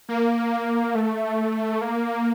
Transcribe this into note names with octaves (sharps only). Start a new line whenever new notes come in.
A#3
A3
A#3